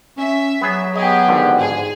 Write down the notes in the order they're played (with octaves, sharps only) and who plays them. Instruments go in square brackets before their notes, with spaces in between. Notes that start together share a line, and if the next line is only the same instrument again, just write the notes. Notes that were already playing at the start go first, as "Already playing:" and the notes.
[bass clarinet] C#4 [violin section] E5
[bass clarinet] F#3 [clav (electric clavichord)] B3 G#4
[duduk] B3 [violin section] G4 G#4 [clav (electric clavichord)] D#5
[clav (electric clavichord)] G#1 F2 D3
[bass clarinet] G#2 [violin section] G#4